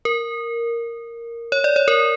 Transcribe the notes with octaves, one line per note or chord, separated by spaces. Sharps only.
A#4
C#5
D5
C#5
A#4